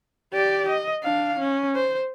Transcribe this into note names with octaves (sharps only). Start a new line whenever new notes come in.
G4 D5
D#5
D4 F5
C#4
C5